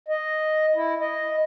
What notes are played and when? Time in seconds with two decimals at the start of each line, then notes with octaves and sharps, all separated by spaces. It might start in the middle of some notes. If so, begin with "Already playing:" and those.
0.08 D#5
0.75 E4
1.00 D#5